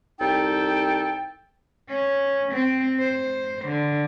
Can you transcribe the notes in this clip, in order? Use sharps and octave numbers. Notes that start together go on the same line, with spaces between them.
C2 D#4 A4 G5
C#4
C4
C5
D3